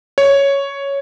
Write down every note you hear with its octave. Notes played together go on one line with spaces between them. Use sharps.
C#5